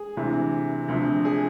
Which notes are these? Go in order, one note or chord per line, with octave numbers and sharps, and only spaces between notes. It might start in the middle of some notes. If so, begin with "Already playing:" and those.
Already playing: G#4
D2 C3 E3
D2 C3 F3
G#4